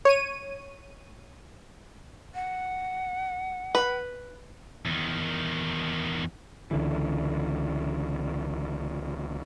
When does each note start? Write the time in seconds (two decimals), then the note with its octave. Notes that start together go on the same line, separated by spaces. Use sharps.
0.05 C#5 D#7
2.35 F#5
3.75 B4
4.86 E2 D#3
6.71 C#2 D3 E3